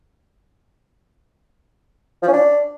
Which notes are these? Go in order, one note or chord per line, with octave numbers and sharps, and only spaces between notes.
F3
C#4
D4